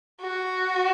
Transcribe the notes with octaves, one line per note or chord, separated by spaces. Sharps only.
F#4